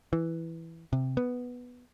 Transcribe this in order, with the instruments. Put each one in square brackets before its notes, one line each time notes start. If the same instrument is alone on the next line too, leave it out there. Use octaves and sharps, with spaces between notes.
[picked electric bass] E3
C3
B3